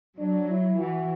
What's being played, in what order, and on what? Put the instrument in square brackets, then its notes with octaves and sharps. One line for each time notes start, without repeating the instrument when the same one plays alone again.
[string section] F#3 [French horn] D4
[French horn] E4
[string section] E3 [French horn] F#4